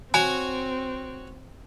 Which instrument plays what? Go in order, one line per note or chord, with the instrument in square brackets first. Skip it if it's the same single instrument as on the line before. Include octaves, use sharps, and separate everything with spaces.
[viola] C4 [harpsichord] F#4 C#5 [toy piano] G#5